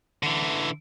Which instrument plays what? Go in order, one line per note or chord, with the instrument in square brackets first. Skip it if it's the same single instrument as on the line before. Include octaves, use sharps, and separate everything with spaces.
[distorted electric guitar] D3 E3